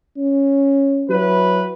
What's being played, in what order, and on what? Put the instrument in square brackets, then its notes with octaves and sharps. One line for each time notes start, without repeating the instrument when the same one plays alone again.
[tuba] C#4
[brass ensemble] F#3 E4 B4